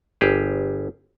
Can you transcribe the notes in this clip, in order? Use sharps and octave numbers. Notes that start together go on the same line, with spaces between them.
G1 G4 G#4